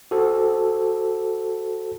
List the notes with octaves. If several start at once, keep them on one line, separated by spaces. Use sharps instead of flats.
F#4 A4 C5